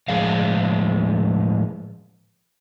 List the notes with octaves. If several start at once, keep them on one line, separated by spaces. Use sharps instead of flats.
A2 F3 G#3 D5 F5